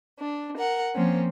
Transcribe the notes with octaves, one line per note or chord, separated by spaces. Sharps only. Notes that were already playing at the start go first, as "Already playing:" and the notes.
D4
A#4 F#5
F3 A#3 C4 C#4